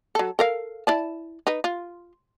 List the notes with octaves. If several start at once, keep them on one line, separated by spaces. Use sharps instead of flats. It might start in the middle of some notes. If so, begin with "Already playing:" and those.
F#3 A4
A4 A#4 F5
E4 D5 A5
D#4 B4
F4